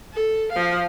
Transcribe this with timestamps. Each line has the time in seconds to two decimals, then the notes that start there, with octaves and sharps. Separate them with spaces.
0.13 A4
0.52 F3 F5